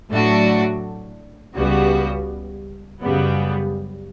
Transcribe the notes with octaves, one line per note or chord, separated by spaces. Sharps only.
A2 F#3 A3 D4 F#4
C#2 C#3 G3 B3 F#4
F#2 C#3 G3 B3